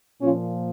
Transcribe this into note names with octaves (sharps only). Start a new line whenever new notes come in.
A#2 F3 C#4 F4